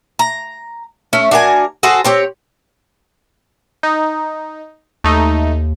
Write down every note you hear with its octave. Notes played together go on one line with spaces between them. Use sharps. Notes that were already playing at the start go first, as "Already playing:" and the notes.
A#5
A3 C#4
D4 F#4 A#4 G#5
F#4 G#4 A4 C5
C4 G4 C#5
D#4
D#2 A3 D#4